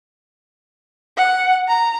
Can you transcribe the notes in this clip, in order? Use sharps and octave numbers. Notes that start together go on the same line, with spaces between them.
F#5
A#5